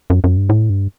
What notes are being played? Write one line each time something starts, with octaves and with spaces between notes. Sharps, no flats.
F#2
F#2
G2
A2
G2